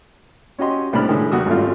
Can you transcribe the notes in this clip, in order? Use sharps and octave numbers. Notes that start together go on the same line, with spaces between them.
C#4 F#4 G4 D#5 C6
C2 A2 D4 B5 F6
A2 D3 D#3 G#3
E2 G3 F#4 D#6
G#1 F#2 A3 F4